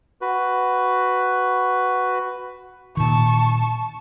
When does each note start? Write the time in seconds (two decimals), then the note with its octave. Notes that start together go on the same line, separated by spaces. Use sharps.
0.21 F#4 B4
2.97 A#2 D#3 A5 C#6